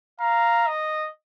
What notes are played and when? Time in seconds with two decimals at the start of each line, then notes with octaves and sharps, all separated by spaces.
0.20 F5 A#5
0.67 D#5